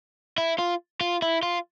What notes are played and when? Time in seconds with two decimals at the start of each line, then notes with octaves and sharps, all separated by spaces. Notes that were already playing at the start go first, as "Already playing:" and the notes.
0.38 E4
0.59 F4
1.01 F4
1.22 E4
1.43 F4